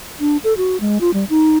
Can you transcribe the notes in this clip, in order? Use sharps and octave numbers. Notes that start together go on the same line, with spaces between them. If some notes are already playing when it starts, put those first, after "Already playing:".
D4
A4
F#4
G#3
F4
G3
D#4